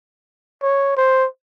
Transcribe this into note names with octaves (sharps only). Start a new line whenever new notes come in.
C#5
C5